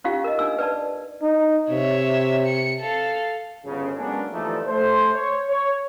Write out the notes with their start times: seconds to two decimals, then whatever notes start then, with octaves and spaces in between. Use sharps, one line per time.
0.04 C#4 D#4 F4 G4 F5
0.24 A#4 D#5
0.39 D4 D#4 G#5 E6
0.58 B4 D5 A5
1.22 D#4
1.70 C3 C#5 E5
2.47 C#7
2.79 A4 F5
3.65 G1 C#3
3.98 F#3 G#3 A#3 B3 C#4 D4
4.32 G1 E3 F3 A3 D#4 D5
4.67 A3 C5
5.14 C5 C#5
5.47 C#5